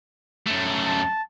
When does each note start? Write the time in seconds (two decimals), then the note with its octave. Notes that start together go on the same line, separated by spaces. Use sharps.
0.47 F#2 A3
0.87 A5